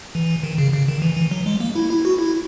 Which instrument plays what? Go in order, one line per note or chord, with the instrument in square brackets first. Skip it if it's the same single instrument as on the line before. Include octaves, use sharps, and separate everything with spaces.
[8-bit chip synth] E3
D#3
C#3
C#3
D#3
E3
E3
F#3
G#3
A#3
E4
E4
F#4
E4